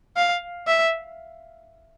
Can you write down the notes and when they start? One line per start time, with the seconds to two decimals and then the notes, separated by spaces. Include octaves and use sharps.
0.17 F5
0.67 E5